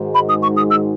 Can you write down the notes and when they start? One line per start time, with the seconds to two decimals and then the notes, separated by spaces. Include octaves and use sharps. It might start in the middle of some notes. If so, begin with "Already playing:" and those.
Already playing: G#2 D#3 G#3 D#4 F#4
0.14 B5
0.29 D#6
0.42 C#6
0.56 D#6
0.70 E6